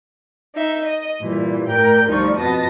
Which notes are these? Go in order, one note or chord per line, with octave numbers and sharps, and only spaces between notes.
D#4 E5
D#5
A#2 E3 G3
A2 A3 A#4 D5 G5 G6
D2 F3 G3 D#4 D5 C#6
F2 B2 B3 D#5 A5 A#6